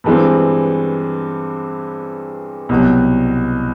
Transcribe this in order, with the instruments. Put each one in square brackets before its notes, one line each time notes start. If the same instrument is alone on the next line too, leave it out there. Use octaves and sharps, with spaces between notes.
[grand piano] G2 E3 G#3 C4
C2 B2 F#3